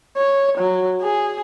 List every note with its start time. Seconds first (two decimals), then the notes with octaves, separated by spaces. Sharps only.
0.17 C#5
0.58 F#3
1.02 G#4